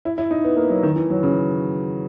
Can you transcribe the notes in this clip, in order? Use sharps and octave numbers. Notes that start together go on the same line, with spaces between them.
E4
E4
D#4
B3
A#3
F#3
D#3
E3
F#3
C#3